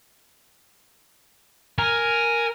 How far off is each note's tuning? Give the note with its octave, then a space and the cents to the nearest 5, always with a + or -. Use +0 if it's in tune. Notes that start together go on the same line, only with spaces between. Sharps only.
A#4 +0 G#5 +0